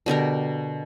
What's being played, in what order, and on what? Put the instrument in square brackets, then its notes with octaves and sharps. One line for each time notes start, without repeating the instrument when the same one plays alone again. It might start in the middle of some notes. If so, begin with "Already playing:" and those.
[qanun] B2 D3 G4 A#4